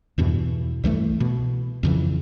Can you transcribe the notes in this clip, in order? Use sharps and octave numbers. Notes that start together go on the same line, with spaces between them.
E2 G2 B2 E3
C2 E3 G3 A3
B2
F2 C#3 E3